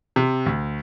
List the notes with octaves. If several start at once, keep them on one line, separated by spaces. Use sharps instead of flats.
C3
D2